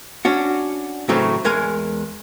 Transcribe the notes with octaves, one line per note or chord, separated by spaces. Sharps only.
C#4 D4 F#4
A2 C#3 E3 F#3 A3 C4
E2 G#3 A#4 G#5